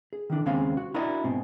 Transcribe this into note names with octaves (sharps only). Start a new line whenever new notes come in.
G#4
D#3 E3 D4 A4
D#2 C#3 G#3 C4 F5
F#4
D4 E4 F#4 A#4 D5 D#5
G#2 B2 C4